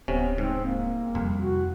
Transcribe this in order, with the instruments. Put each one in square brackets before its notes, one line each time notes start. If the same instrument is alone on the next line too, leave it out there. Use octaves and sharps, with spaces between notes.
[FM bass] D1 [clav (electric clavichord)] C3 C#4 [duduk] B3
[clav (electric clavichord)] G#2 [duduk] C4
[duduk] A#3
[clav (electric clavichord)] C2 [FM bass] F2
[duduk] F#4